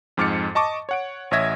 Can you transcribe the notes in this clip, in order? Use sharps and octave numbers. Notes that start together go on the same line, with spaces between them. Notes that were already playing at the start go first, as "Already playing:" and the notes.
F2 G#2 D6 F6 A6 C#7
D#5 A5 C#6 D6
C#5 F#5 D7
A1 C#5 D#5 E5 G#6 A#6